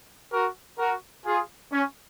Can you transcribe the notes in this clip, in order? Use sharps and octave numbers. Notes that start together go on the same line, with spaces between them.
F#4 A#4
F#4 A#4
F4 G#4
C#4